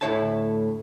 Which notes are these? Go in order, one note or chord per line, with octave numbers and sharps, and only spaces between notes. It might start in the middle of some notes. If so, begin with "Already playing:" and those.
D2 A2 E4 C#5 E5 A5